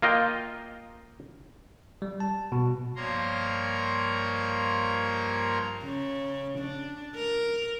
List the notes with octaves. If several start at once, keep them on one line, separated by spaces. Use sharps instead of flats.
A#3 F4 D#5 G5
G3
A5
B2
G2 F3 A#3 C#5 A#5 C6
C#3
D4
A#4